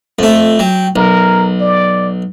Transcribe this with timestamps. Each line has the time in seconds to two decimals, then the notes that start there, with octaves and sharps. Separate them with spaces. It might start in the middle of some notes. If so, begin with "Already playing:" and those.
0.19 F2 A3
0.59 F#3 G5
0.96 B1 A#4
1.61 D5